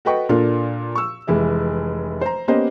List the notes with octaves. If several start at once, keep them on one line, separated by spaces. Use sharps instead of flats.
F#4 A4 B4 D#5 G5 C#6
A#2 A#3 D4 F4 A4 A#4
C#6 E6
F1 E3 G#3 E5
C5 A#5
A#3 B3 C#4 G4 C5 D#5